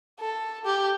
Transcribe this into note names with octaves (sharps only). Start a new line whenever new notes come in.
A4
G4